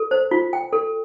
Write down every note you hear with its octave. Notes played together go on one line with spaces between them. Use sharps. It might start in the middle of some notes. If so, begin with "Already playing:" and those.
Already playing: A4
C5
F4
G5
A4